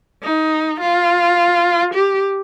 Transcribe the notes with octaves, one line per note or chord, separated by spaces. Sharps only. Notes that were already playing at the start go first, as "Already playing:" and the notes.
D#4
F4
G4